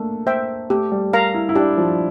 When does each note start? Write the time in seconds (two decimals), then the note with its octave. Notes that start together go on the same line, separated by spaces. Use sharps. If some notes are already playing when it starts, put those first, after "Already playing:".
Already playing: A3 A#3 D4
0.27 C5 E5 G5
0.70 A3 G4
0.92 G3
1.13 A#4 F5 A#5
1.34 E4
1.49 E4
1.55 D4 G4
1.77 F3